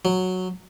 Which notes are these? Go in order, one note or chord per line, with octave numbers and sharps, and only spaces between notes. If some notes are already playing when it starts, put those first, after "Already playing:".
F#3